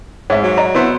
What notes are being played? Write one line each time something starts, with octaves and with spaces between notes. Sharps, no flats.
G#2 C#5 E5
F#3
D5 D#5 A#5
B3 E4 C5